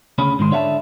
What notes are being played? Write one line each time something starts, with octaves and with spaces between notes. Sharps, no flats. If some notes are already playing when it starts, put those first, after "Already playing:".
D2 C#3 C#4 B5
G#2 D#3 C6
D3 C#5 E5 F5 A5